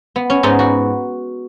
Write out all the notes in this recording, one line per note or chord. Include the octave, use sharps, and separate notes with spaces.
B3
C#4
G#2 B3 D#4
F#4